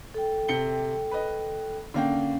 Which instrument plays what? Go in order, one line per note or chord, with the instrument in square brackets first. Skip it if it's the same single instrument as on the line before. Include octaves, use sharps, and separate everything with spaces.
[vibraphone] A4 G5
[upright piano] C3 C#7 G7
B4 D#5
[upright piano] D3 A#3 G5 [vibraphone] C#4 F5